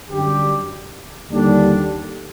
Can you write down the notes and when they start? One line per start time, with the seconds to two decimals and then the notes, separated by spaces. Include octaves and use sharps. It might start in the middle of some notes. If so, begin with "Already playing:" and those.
0.10 F#2 D3 G3 D4 G4
1.31 D#2 D3 G3 D4